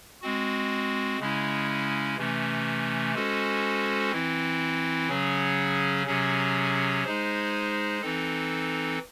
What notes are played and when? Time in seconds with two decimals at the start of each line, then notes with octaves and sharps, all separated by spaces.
0.22 G#3 C4 F#4
1.19 C#3 G#3 C#4 E4
2.17 C3 E3 A3 C#4
3.15 G#3 C#4 F#4 A4 C5
4.12 E3 C4 E4
5.09 C#3 F#3 C#4 G#4
6.07 C3 F#3 C#4 G#4
7.04 G#3 D#4 G#4 C5
8.02 E3 C4 D#4 A4